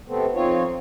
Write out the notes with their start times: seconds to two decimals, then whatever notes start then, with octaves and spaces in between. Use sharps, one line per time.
0.07 C3 A3 B3 C4
0.34 F2 C4 D#4 F4 C#5